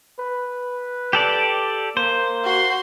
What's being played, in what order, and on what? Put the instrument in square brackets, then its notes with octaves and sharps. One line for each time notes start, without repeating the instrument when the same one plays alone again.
[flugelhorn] B4
[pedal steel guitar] G4 A4 D5
[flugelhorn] A#3 [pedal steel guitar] C5
[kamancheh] F#4 C6